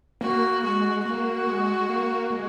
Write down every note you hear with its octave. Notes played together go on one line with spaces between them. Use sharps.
A#3 F#4
G#3 F#4
A#3 F#4
G#3
A#3
G#3